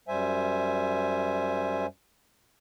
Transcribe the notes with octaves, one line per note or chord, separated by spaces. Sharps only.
F#2 G3 C5 E5 G#5